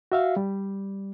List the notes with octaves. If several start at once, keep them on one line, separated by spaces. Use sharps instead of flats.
F#4 E5 F5
G3